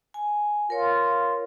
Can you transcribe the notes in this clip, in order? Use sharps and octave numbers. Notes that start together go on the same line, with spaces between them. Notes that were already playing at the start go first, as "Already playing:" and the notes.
G#5
F4 A#4 C#5